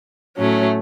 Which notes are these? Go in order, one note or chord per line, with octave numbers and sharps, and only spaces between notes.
A2 F#3 A3 C#4